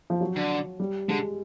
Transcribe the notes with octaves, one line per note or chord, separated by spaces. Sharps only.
F3
F#3
D3
G3
D3 G#3